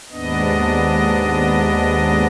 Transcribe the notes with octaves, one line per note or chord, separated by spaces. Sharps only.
D#2 G#2 B3 D4 D#5